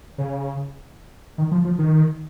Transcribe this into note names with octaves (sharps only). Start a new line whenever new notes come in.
C#3
D#3
F3
F3
D#3